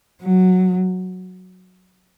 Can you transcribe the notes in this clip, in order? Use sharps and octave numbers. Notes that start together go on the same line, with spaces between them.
F#3